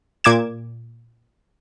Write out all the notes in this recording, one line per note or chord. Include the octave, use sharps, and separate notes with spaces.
A#2 D6 G#6 E7